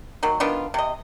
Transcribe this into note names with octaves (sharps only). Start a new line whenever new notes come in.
D#3 F#3 A#3
D#3 B3 D4 F4
C3 D#5